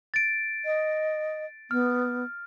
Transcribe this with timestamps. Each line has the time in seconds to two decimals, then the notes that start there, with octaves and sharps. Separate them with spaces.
0.14 A6 D7
0.65 D#5
1.71 B3 F6